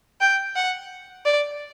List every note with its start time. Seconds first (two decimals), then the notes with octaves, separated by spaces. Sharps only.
0.21 G5
0.56 F#5
1.25 D5